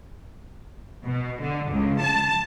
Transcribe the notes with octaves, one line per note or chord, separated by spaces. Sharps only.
B2
D3
C#2
A5